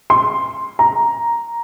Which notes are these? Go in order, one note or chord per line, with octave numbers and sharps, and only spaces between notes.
C6
A#5